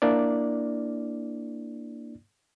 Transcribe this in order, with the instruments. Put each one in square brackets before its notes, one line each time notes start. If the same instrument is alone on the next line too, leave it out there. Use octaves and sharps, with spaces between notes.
[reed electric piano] A#3 D4 E4 D5